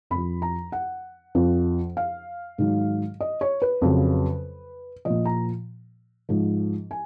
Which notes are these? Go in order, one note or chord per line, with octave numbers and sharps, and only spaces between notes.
F2 F3 B5
A#5
F#5
F2 F3
F5
G#2 D#3 F#3
D#5
C#5
B4
F2 C#3 F#3
A#2 F3 D#5
A#5
G#2 F3
G#5